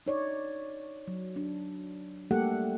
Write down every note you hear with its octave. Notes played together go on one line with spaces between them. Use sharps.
D#4 C#5 D5
F#3
D4
G3 A3 A#3 G4 A4 F#5